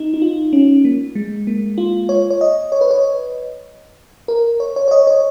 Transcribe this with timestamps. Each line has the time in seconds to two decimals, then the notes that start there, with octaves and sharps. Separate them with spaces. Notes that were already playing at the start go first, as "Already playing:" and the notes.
Already playing: D#4
0.14 D#4
0.22 F4
0.53 C#4
0.85 A#3
1.15 G#3
1.47 A#3
1.78 F4
2.09 C#5
2.30 C#5
2.41 D#5
2.72 C#5
2.81 B4
2.91 C#5
4.28 A#4
4.60 C#5
4.76 C#5
4.88 C#5
4.91 D#5
5.07 C#5